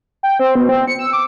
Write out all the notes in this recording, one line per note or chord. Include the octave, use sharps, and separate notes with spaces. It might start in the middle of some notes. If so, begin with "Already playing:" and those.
G5
C4
B2
C4
C#7
E6
D6